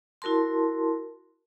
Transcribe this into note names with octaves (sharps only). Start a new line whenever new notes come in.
E4 F#4 A#4 A5 C6